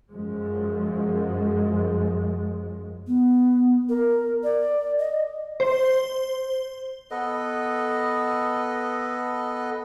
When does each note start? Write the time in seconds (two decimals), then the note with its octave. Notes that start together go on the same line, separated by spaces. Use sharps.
0.11 F#2 F3 G#3
3.07 B3
3.89 A#4
4.43 D5
4.99 D#5
5.60 C5
7.11 B3 A4 B4 D#5